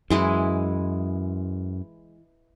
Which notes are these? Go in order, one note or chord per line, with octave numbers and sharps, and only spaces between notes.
F#2 E3 G#3 E4